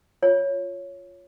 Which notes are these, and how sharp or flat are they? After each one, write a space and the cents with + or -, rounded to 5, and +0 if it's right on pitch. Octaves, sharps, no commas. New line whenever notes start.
F4 +0 C#5 +0